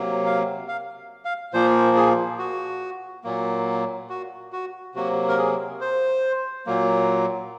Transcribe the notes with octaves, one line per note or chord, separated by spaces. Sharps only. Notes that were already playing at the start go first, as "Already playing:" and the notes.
Already playing: C3 F#3 A#3
F5
F5
F5
A#2 F3 A#3 C5
G#4
F#4
A#2 F#3 A#3
F#4
F#4
C3 F#3 A#3 F#4
A#4
G#4
C5
A#2 F#3 A#3